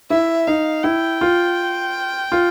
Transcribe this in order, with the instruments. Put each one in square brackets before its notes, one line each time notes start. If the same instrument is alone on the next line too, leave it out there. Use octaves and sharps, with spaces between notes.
[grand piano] E4 [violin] E5
[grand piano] D#4 [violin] F5
[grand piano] E4 [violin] G5
[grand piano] F4
F4